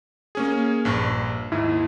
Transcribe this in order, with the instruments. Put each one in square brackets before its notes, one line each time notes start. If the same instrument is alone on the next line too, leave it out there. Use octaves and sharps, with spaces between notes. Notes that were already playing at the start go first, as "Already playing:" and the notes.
[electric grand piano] A#3 C#4 G#4
A#1 G2
[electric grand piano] D#2 G#2 [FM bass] E4